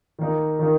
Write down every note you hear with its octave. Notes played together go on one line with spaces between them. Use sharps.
D#3 A#3 D#4
D#3 A#3 D#4